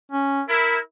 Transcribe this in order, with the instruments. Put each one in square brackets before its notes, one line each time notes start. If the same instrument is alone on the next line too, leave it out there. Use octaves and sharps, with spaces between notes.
[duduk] C#4
[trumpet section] E4 [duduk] A#4